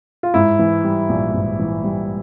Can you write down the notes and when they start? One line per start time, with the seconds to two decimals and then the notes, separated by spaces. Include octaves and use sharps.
0.23 F4
0.34 G#2 E4
0.59 E3
0.84 G3
1.09 A#1
1.34 G#2
1.59 E3
1.84 G3